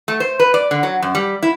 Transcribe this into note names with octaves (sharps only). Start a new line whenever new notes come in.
A3
C5
B4
D5
D3
F#3
F#2
G3
E4